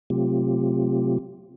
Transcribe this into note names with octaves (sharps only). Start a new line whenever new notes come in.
C3 F#3 A3 C4 F4 G4